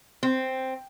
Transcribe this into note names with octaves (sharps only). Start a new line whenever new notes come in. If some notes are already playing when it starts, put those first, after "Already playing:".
C4